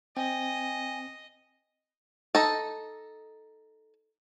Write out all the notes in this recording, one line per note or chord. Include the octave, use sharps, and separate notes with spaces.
C4 D#5 G5 G#5
D#4 A4